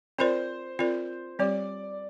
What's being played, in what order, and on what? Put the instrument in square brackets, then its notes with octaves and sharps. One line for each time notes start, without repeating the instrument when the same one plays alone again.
[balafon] C4 F4 A#4 D5 [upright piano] C5
[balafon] C4 F4 A#4 D5
[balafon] G3 C4 G4 [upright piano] D5